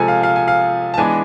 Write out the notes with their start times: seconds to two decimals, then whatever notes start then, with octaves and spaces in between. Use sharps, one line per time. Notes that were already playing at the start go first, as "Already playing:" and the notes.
Already playing: C3 F3 G#3 A4 G#5
0.08 F5
0.23 F5
0.36 G#5
0.48 F5
0.94 A5
0.98 E3 G#3 B3 D4 G#5